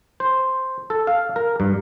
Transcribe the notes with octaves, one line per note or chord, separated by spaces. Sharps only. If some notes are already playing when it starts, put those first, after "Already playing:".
C5
A4
F5
A#4
G2